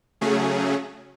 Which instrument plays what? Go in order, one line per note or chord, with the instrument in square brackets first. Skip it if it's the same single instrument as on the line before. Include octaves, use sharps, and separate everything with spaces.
[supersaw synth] C#3 F#3 A3 C#4 G#4